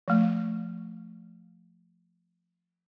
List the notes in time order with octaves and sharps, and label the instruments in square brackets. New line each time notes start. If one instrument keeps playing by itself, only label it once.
[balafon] F3 A3